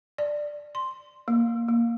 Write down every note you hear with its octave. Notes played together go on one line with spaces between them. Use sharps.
D5
C6
A#3
A#3